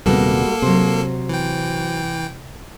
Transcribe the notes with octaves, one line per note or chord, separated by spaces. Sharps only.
D#1 C3 G3 G#3 A#3 B3 F#4 A4
C3 F#3 C5
E3 G5